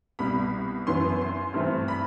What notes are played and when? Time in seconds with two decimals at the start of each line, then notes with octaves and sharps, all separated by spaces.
0.19 C2 B2 G3 B5
0.87 F#2 E3 B3 C6
1.09 C6
1.21 C6
1.54 G2 E3 A3 C4
1.88 B5